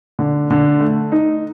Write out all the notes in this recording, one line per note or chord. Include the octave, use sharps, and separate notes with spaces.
D3
D3
A3
D#4